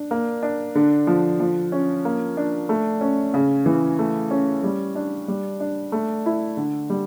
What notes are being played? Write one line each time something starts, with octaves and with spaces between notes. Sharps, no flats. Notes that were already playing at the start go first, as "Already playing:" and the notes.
Already playing: D4
A#3
D4
D3
F3
F3
C#4
A#3
D4
A3
C#4
C#3
E3
A3
C#4
G3
D4
G3
D4
A3
E4
D3
G3